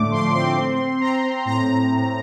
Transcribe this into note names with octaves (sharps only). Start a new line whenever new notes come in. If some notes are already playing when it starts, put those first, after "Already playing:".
Already playing: A2 D3 A3 D6
F3 C6
C4 C6
C4
C4
C4 A#5
C4
A2 A#5
A2
A2